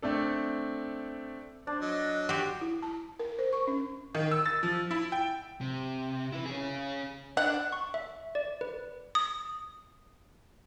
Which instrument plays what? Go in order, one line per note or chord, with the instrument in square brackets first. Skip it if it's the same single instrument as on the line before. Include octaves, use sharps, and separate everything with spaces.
[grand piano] A3 C4 D4 A4
[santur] D4 [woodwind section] C5
[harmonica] F#3 [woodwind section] D#5
[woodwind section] C#2 B3 C6 [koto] F#4 G4
[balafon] E4
A5
A#4
C5
C#6
C#4
[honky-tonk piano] D#3
E6
A6
F3
E4
G5
[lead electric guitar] C3
E4 B4
C#4 G#4
[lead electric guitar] D4 [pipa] F#5
[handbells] C#6
E5
D5
B4
[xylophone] D#6